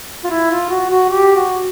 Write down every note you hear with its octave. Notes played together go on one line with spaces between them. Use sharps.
F4
E4
F4
F#4
F#4
G4
F#4